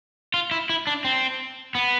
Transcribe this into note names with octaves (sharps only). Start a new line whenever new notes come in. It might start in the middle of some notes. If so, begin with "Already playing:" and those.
F4
E4
E4
D4
C4
B3